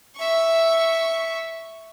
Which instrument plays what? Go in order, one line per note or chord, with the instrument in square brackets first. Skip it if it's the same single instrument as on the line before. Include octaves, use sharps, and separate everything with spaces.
[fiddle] E5 C#6